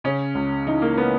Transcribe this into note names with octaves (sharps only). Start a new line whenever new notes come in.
C#3 C#4
C#2
E3 D#4
A#3
B3